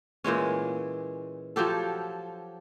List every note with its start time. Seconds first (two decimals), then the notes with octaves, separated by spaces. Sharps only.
0.24 A#2 E3 G#3 C#4
1.56 F3 F#3 G4 A4